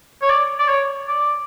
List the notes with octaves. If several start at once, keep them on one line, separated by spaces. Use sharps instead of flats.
C#5
D5
D5
C#5
D5